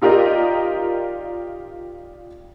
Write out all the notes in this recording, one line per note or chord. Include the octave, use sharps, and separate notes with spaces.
D#4 F4 G4 A#4 D5 D#5